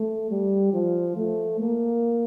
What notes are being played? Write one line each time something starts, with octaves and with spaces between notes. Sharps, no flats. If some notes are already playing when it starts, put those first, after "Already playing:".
Already playing: A3
G3
F3
A3
A#3